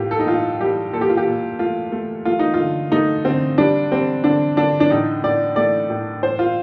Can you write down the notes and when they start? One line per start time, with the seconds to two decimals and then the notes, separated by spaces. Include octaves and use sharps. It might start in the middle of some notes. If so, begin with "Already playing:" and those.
Already playing: A2 F4 G4
0.11 A4
0.19 D#4
0.27 A2 F4
0.60 G3 G4
0.93 A#2 A4
1.01 G4
1.09 F4
1.17 G4
1.27 A#2
1.59 A3 F4
1.92 A3
2.25 A3 F4
2.39 D#4
2.54 F4
2.59 D3
2.92 A3 D#4
3.25 D3 C4
3.58 G3 D4
3.91 G3 C4
4.24 D3 D4
4.57 D3 D4
4.80 D4
4.90 A2 D#4
5.23 A2 D5
5.56 A3 D5
5.90 A2
6.23 A2 C5
6.39 F4